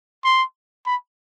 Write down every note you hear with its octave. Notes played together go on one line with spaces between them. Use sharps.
C6
B5